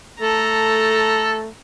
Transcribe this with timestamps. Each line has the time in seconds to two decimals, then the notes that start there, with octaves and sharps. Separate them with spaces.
0.21 A3 A4 A#5